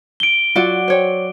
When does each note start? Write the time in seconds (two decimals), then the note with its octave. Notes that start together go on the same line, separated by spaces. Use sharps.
0.20 D7 G7
0.56 F#3 F4 F#4 D5
0.88 C5 C#5 G5